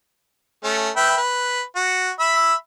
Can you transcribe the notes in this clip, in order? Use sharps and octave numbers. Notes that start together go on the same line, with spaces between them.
A3 C#4
B4 E5 G5
B4
F#4
E5 B5 E6